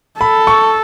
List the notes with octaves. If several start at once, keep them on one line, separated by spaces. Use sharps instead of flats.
A4 B5
C#6